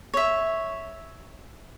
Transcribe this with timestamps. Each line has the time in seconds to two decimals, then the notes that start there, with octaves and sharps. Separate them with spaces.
0.14 C#5 E5